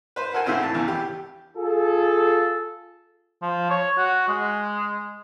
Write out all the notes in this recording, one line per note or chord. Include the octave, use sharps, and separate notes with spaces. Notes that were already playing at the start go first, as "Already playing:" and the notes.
B4 C5
F#4 A4 A#4 C5 F#5 G#5
G#2 C#3 E3 C4 E4 F#4
A2 A5
G#1 E2 C#3 E3
G4
F4 G#4 A4
F3
C#5
F#4
G#3